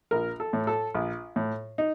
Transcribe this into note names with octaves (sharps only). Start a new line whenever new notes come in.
A#1 A#4
A4
A2
A4
A#1
A2
D#4